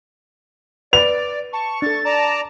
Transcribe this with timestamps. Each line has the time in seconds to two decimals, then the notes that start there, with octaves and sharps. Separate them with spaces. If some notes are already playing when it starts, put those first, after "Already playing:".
0.93 B4 D5 F7
1.53 A5 C#6
1.82 D4 A4 A6
2.05 D5 A5 A#5